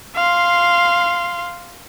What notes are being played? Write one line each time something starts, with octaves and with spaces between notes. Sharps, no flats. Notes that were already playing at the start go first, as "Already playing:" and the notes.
F5 C6